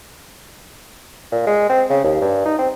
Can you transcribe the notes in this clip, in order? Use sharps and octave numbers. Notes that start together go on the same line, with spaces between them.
A#2
G#3
C4
C#3
D#2
G2
D#4
C4